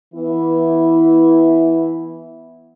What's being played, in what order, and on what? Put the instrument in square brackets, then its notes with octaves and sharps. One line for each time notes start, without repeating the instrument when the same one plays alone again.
[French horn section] E3 B3 E4